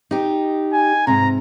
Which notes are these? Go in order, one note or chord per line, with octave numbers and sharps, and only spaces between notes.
D#4 G4
G#5
G#2 C3 A#5